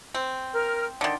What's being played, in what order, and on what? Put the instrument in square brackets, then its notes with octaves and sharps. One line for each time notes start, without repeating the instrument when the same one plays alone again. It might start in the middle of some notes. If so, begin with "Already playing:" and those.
[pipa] C4
[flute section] A#4 F6
[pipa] D3 D#3 [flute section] D5 C6